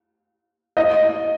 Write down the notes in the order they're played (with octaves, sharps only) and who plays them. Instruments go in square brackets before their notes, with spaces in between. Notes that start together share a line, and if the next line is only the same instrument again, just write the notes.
[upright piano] D#5